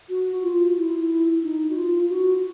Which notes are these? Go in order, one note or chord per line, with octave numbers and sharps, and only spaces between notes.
F#4
F4
E4
D#4
F#4
F4
F#4